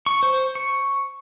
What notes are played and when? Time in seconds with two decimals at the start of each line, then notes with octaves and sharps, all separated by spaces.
0.06 C#6
0.23 C5
0.55 C#6